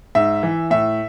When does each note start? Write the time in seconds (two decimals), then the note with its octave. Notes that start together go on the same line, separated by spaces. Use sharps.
0.15 G#2 E5
0.43 E3
0.71 A2 E5